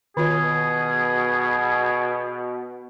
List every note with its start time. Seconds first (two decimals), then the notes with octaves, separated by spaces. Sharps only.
0.17 B2 D#3 F4 G#4 C#5